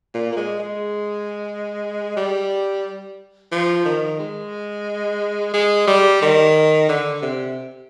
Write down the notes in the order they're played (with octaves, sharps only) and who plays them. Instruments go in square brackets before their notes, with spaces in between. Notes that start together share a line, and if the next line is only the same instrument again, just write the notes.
[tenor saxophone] A#2
A#3
G#3
G#3
G3
F3
D#3
G#3
G#3
G3
D#3
D3
C3